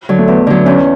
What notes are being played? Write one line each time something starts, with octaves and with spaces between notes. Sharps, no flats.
D3 F#3
A3
E2 B3
D3 F#3
E2 C#4